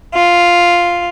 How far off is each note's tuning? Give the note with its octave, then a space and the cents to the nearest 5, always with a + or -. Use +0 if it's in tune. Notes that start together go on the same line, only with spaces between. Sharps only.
F4 +0